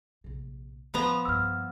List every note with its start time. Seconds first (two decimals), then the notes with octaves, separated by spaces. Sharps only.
0.24 A#1 C3
0.94 A1 A#2 F3 B3 A#5
1.25 F#1 G2 E6 F6